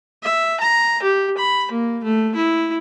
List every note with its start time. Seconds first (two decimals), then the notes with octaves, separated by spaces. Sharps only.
0.23 E5
0.60 A#5
1.03 G4
1.37 B5
1.71 A#3
2.04 A3
2.35 E4